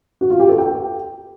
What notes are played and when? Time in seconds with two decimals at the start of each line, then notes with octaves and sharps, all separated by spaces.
0.21 F#4
0.30 F4
0.40 G4
0.49 A4
0.58 G5